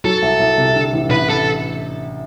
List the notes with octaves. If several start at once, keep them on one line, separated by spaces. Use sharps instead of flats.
F#3 A4
C2
C2
C3
D3
A1
A1 B4
A4